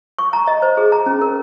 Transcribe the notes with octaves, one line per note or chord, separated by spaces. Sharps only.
C#6
A#5
D#5
C5
G#4
A#5
C#4
A#4